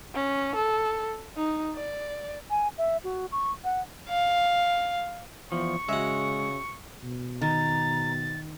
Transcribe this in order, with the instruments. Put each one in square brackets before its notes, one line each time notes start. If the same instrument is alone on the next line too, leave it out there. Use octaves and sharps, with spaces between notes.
[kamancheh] C#4
A4
D#4
D5
[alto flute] G#5
E5
F#4
C#6
F#5
[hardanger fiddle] F5
[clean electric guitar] E2 F3 [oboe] C#6
[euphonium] C#3 [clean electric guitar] G#3 [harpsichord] F#4 E5
[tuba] B2
[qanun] D#3 [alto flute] A#5 [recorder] A6